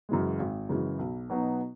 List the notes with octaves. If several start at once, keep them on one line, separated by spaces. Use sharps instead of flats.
F#2 C#3 E3 G#3
G#1
F#2 C#3 E3 G#3
B1
B2 F#3 B3 D#4